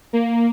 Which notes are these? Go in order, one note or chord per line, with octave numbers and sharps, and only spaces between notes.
A#3